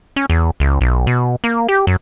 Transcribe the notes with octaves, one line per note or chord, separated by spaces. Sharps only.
C#4
E2
C#2
B1
B2
A#3
G4
F#2